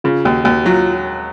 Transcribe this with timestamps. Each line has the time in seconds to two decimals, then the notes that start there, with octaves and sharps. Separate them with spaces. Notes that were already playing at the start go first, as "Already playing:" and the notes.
0.04 C#3 F4
0.25 D#2 F#4
0.45 D#2 F#4
0.65 F#3 F4